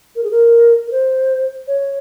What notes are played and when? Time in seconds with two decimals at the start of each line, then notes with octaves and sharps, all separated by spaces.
0.16 A#4
0.23 G#4
0.31 A#4
0.87 A#4
0.92 C5
1.68 C#5